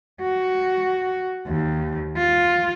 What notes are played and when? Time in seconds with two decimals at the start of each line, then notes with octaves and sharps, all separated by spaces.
0.22 F#4
1.47 D#2
2.17 F4